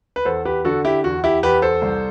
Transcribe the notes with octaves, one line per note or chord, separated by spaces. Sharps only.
B4
E2 A4 C5
G4 B4
D3 F#4 A4
E4 G4
E2 F#4
E4 G4
E2 G4 B4
A4 C5
C2